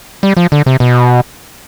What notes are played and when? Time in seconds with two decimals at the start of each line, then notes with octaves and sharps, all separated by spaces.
0.23 G3
0.37 F3
0.52 D3
0.66 C3
0.80 B2